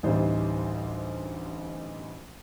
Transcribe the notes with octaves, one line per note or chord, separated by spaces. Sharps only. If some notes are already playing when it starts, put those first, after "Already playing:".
A1 D2 E3 G3 D#4 C5